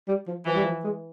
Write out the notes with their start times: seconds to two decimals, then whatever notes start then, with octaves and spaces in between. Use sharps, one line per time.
0.08 G3
0.28 F3
0.46 E3 F3
0.55 G3
0.65 F3
0.84 G#3